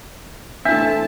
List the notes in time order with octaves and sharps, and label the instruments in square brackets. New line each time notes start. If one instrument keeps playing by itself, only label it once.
[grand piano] E3 B6 [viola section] A3 C4 A5 [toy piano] D4 [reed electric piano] E5